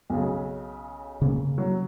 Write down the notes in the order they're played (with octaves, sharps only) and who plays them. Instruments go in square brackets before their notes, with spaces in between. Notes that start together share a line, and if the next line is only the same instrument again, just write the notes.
[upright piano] B1 C#3
[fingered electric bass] C#3 A#3
[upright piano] F#3